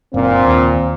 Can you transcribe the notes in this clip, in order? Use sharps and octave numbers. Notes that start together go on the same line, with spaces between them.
F#1 A#2 C4 D4
D#2